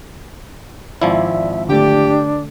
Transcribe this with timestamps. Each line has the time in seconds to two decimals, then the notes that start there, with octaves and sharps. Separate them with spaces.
1.02 G#1 F3 E4 D5 E5
1.69 D3 A3 D4 G4